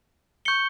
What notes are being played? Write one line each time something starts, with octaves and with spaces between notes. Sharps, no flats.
C#6 G6 C#7 G7